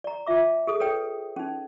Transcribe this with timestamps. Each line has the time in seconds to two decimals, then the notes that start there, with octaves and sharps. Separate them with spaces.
0.04 D5 A#5
0.26 F4 E5 D6
0.67 G#4 A4 D#6
0.80 A4 B4 C#5 G5
1.36 C#4 D#4